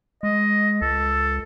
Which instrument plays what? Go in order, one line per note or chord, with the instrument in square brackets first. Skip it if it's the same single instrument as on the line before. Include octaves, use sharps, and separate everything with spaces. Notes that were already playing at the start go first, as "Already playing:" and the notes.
[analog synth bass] G#3 [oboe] D#5
[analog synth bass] C#2 [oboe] A4